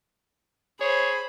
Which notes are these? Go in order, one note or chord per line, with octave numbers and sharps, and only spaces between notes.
G#4 C5 C#5 B5